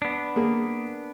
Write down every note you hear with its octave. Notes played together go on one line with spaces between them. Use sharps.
B3 D4
A#3 G#4